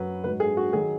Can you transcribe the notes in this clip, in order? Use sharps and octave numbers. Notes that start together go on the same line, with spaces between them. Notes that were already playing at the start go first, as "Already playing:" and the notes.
Already playing: F#2 F#3 B4
G#2 F#3 B4
G#4
F#4
D#3 F#3 G#4